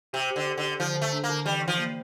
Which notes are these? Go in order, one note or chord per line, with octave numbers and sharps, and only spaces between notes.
C3 G4
G4
D3
G4
D3
G4
D3 F3
D3
A3
D4
A#3
D3
E3 G3
E3
F3
A#3